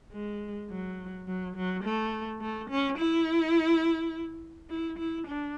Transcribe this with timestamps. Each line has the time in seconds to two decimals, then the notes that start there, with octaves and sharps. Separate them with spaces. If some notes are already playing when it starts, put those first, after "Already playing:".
0.13 G#3
0.70 F#3
1.27 F#3
1.56 F#3
1.84 A3
2.41 A3
2.70 C#4
2.98 E4
4.70 E4
4.99 E4
5.27 D4